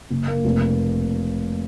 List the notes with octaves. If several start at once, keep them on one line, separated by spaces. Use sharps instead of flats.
F#1
A#3
F1